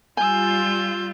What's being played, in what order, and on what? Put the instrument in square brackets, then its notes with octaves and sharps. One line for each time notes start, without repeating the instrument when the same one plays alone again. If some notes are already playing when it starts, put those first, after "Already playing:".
[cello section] G3 F4 [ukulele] G#5 [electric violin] E6 G6